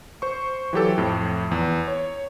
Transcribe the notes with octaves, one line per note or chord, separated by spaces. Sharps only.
C5 C#6
E3 F#3 G4 A4
F2 A2
E2
C#5